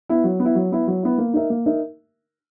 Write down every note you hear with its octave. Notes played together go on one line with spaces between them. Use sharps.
B3 E4
F#3
B3
E4
F#3
B3 E4
F#3
B3 E4
A#3
D#4 A#4 E5
A#3
D#4 A#4 E5